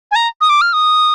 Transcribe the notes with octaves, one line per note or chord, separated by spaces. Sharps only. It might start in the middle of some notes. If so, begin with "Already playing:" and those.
G#5
A#5
D#6
D6
F6
D#6